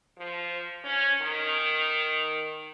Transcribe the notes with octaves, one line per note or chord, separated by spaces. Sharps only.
F3
C#4
D#3